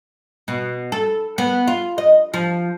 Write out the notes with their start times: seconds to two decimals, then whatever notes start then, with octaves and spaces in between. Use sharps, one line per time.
0.48 B2
0.92 A4
1.38 B3
1.67 F4
1.98 D#5
2.34 F3